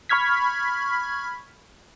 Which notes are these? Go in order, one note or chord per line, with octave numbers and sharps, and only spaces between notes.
B5 C#6 F6 G#6 B6